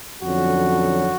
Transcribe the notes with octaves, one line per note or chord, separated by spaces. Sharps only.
F2 D3 F#3 C#4 F#4